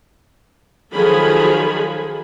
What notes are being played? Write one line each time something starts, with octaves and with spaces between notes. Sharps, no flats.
D#3 F3 F#3 G#4 A4 B5